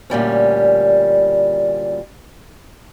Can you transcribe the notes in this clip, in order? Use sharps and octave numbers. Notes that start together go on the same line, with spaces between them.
D2 A#2 G3 C#4